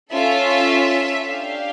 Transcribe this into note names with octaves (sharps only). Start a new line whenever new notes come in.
C#4 F4 A4 E5
D4 G4 F5